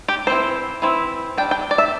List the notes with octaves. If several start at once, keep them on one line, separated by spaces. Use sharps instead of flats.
G4
E3 C4 E4 C5
E3 C4 E4
G3 D4 G5
G5
D5
E5